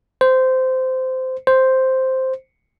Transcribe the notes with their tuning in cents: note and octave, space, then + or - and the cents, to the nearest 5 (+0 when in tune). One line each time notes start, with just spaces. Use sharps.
C5 -15
C5 +0